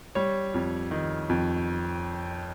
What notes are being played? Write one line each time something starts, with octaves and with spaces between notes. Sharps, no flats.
G3 C#5
F2
D#3
F2